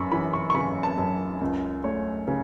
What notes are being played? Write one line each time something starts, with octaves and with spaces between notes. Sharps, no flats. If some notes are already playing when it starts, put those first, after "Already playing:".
Already playing: F#2 B5 C#6
E3 B5
C#6
C#6
C#3 B5
A5
F#2
C#2
A3 C#5
C#3